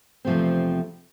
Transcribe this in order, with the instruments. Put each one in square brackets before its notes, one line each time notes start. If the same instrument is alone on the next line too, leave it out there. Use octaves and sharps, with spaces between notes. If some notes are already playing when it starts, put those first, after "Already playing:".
[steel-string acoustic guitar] E2 C3 F3 A3 C4